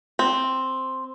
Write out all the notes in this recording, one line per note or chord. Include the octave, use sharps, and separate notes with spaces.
C4